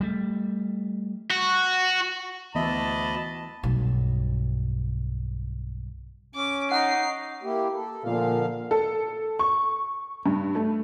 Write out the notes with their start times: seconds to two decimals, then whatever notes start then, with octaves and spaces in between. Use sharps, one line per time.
0.01 G3 A3
1.31 F#4
2.55 D2 E3 B3 D#5 E5 A5 B5
3.63 B1 G2
6.35 C#4 D6
6.72 D#4 F#5 A#5 C7
7.43 A#3 E4 G4
7.74 A4
8.04 A#2 D3 F3 F5
8.71 A4
9.39 C#6
10.26 G2
10.55 A3